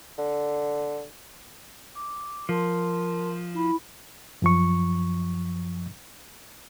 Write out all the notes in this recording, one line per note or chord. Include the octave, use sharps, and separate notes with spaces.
D3
D6
F3 A#4 A5 C6
E4 B5
F#2 F3 C#6